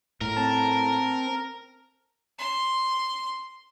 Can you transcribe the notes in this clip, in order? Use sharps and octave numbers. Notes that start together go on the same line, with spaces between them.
A2 A#4
C4 A5
C6